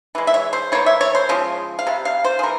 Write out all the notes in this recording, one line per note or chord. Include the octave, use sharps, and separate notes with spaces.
E3 G#3
E5
C#5
C5
E3 A#3 C#5
E5
C#5
C5
C#3 F3 G#3
F5
C3 G3
F5
C5
G#4
E3 A#4